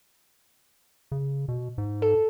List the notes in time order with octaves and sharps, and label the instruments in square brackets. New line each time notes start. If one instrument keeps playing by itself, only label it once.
[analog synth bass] C#3
B2
G#2
[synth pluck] A4